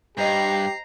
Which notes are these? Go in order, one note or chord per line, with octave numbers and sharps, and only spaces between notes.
G2 G4 C5 D#5 F5 A#5 C7